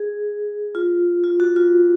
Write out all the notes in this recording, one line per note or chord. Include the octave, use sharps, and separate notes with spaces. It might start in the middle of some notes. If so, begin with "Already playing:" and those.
Already playing: G#4
F4
F4
F#4
F4